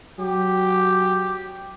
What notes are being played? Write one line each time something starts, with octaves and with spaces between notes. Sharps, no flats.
F#3 G4